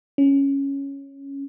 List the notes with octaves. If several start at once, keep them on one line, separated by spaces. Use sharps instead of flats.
C#4